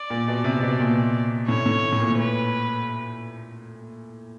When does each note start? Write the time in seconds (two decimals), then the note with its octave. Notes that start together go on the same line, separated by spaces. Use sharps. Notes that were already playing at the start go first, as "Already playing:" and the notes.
Already playing: D5
0.10 A#2
0.28 B2
0.44 C3
0.63 B2
0.80 A#2
1.48 A2 C#5
1.66 A2
1.93 A2
2.00 A#2
2.18 B4